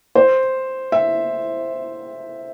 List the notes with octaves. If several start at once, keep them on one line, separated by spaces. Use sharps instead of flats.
C5
E5